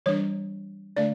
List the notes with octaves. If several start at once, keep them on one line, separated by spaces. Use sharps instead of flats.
E3 G3 D4 C#5
D3 A3 D4 D5